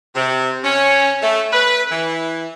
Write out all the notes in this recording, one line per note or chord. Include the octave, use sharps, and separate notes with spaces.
C3
C#4
A3
B4
E3